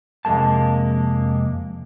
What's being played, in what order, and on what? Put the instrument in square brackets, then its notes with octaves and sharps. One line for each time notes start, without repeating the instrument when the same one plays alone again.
[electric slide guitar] F2 C3 G#3 A#3 A5